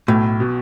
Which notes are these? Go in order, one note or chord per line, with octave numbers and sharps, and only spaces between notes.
B1 A2
B2